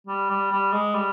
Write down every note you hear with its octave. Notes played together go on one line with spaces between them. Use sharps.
G3
G3
G3
G#3
G3